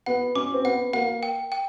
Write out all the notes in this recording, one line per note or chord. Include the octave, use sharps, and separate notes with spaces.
B3 F#5
C#4 D6
C4
B3 F#5
A#3 F#5
G5
G5